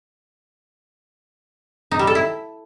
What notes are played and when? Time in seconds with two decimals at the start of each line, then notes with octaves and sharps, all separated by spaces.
1.91 D#4
1.99 G3
2.07 A4
2.15 E4